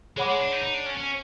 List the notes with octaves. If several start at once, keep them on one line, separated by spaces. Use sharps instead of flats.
G#3 G#4 C#5 F#5 B5 D6
G#3
D4
D#4
D#4
D4
C#4
C#4